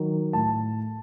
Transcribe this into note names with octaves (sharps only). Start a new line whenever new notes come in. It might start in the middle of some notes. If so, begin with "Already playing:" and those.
Already playing: D#3 F#3
A2 A5